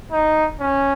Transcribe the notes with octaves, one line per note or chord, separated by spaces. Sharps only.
D#4
C#4